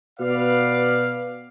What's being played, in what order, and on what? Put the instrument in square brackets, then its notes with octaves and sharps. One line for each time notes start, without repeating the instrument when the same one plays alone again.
[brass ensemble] B2 B4 D5 F5